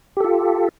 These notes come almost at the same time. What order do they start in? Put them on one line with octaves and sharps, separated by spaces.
G4 A4 F4